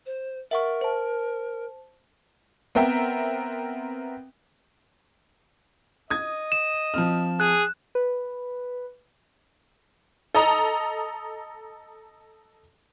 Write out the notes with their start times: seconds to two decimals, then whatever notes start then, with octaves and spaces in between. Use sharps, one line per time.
0.06 C5
0.51 A#4 E5 F#5 C#6
0.81 C5 A5
2.75 B3 C4 A#4 E5 G5
6.10 D#5 D#6 G#6
6.52 E7
6.94 F3 C4 F6
7.40 G#4 F#6
7.95 B4
10.35 A4 D#5 A#5